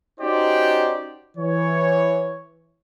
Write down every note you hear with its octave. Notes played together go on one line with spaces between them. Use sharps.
C#4 D#4 F#4 G4 C5 D5
E3 C#5